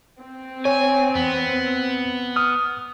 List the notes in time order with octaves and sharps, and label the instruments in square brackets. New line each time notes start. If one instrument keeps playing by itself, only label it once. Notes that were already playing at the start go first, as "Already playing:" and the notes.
[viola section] C4
[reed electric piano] C#5 [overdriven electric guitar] G#5
[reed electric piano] E2 [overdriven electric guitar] B3
[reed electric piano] D#6 F6